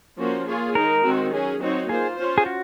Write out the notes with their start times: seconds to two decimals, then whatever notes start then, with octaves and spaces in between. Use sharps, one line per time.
0.18 F3 A#3 C#4 F#4 C5
0.47 A#3 F4 G#4 C#5
0.75 D#3 G#3 D#4 A#4
1.04 D#3 G#3 C4 F#4
1.32 F#3 C#4 G#4
1.61 F#3 C4 D#4 F#4 C#5
1.89 A#3 F4 G#4 C5
2.18 C#4 F4 C5
2.38 G#4
2.46 F#4